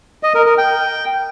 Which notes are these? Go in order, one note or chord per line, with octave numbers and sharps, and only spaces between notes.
D#5
A#4
A#4
G5